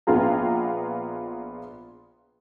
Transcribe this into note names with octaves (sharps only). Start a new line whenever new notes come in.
A#1 B3 F4 G#4 A#5